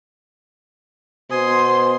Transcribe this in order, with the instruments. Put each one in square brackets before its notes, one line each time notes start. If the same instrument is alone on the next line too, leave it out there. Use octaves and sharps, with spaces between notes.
[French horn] B2 [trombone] C5 [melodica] G#5 D#6 [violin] C6